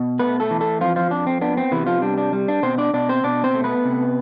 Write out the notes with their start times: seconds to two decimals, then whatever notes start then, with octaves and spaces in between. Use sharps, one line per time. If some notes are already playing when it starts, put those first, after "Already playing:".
Already playing: B2
0.19 A3 B3 B4
0.40 A3 A4
0.51 E3
0.61 A3 A4
0.81 F2 F3 F4
0.96 F3 F4
1.11 F2 D4
1.27 C4
1.41 B3 D4
1.57 C4
1.72 C3 E3 E4
1.87 F3 F4
2.02 G3 D4
2.18 D4
2.33 G3
2.48 D4
2.63 B2 C4 C5
2.78 D4 D5
2.93 B2 D4 D5
3.09 C4 C5
3.24 B2 D4 D5
3.44 C4 C5
3.54 A3
3.64 B3 B4
3.85 C3